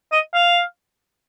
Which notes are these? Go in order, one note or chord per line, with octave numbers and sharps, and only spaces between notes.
D#5
F5